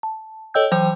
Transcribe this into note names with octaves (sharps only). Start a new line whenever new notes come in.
A5
A4 C#5 D#5 G5 E6 G6
E3 F#3 C5 G5 G6